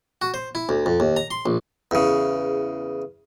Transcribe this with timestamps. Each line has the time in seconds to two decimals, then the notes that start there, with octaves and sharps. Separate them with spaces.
0.22 F#4
0.34 C5
0.55 E4
0.69 D2
0.86 F2
1.00 D#2
1.17 A#5
1.31 C6
1.46 A#1
1.91 E2 C#3